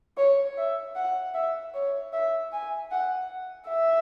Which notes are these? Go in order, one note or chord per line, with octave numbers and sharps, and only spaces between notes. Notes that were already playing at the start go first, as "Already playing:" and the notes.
C#5
E5
F#5
E5
C#5
E5
G#5
F#5
E5